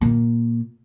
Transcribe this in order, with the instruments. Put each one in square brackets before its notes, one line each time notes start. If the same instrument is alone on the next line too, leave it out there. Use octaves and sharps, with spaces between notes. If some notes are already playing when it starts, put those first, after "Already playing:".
[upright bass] A#2 A#3